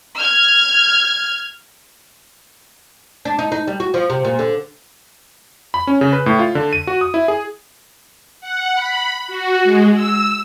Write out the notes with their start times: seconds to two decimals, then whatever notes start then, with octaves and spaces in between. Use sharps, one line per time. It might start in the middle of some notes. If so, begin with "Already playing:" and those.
0.17 F6 G#6
3.25 D4
3.39 D#4
3.52 D#4
3.67 G3
3.80 F#4
3.94 F3
4.10 C3
4.25 A#2
4.39 D3
5.74 B5
5.87 C#4
6.01 C#3
6.13 B4
6.26 A2
6.39 F4
6.55 D3
6.73 D#7
6.87 F#4
7.01 D#6
7.14 E4
7.28 G#4
8.41 F#5
8.75 B5
9.28 F#4
9.63 G#3
9.95 E6